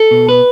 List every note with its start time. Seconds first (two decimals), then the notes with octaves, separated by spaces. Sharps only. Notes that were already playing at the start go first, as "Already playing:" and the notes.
Already playing: A4
0.11 B2
0.29 B4